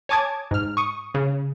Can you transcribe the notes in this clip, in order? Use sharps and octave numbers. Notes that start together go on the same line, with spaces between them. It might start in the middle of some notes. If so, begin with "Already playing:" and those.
C#5 G#5 A5 D6 D#6 G#6
G#2 F6
C#6 D#6
C#3